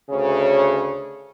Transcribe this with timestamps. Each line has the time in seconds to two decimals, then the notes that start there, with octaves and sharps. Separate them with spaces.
0.10 D2 C#3 C#5